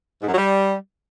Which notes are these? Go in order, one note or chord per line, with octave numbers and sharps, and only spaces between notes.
G#2
F#2
F#3
G3